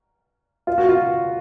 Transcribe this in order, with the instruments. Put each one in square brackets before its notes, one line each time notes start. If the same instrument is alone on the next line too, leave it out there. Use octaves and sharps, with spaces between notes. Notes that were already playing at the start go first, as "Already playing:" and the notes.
[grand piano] F4
F#4
F4